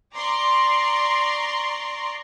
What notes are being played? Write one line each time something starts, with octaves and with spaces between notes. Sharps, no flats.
D5 A#5 C6 C#6